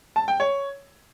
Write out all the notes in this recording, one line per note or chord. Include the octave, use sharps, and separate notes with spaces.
A5
G5
C#5